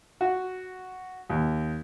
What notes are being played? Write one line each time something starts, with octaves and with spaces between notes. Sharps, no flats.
F#4
D#2